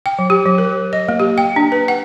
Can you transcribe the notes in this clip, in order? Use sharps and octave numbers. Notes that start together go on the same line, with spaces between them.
G5
F#3
G4
F#3
A#4
D#5
A#3
G4
G5
D4
B4
F#5